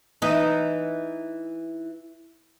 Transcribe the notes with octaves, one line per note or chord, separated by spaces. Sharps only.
E3 D#4